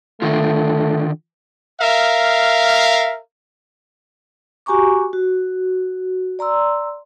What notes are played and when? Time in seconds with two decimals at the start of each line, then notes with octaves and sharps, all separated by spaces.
0.22 D3 D#3 A3 F4
1.81 A#4 E5 F5
4.66 F#4 G4 G#5 A#5 C#6 D6
5.13 F#4
6.39 D5 A#5 C6 E6